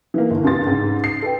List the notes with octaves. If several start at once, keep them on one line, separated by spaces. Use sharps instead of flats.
E3 A#3
G1
C#2 G2 C6 A6
G#2 C#3
C7
A4 B4 G5